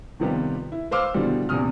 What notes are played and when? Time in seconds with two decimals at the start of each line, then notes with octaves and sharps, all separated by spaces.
0.20 C3 D#3 F3 G3 B3 G4
0.72 E4
0.91 B4 C5 F5 D6 E6 F6
1.14 B2 D3 E3 F3 G3
1.49 A#1 E2 C3 D#6 F6